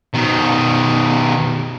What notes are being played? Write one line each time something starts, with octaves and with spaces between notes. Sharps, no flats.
B2 D#3